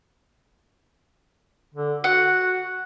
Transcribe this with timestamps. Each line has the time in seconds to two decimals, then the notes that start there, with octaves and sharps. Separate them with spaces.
1.74 D3
2.04 F#4 F#5